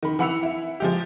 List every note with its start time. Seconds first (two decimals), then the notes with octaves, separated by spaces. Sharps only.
0.03 D#3 B5
0.19 E3 F#5 B5 E6 C#7 F7
0.43 E4
0.80 F3 G#3 G4